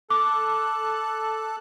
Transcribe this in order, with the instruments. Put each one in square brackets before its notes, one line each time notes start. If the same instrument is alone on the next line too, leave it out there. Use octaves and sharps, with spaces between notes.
[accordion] A4 F#6 [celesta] D6